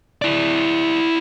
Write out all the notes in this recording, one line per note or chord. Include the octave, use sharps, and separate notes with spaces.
E4 D5